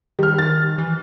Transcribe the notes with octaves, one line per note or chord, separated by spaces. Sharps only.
D#3 G3 F6
A6
E3